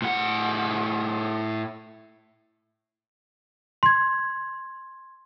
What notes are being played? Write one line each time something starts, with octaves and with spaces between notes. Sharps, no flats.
A2 F#5
C6 G#6